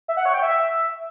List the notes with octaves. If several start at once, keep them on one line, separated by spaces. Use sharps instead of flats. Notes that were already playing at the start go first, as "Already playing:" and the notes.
E5
F#5
C#5
G5
E5